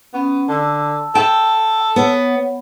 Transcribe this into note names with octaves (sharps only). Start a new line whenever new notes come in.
B3 C#4
D3 A5 E6
A4 G5
B3 C#5 F#5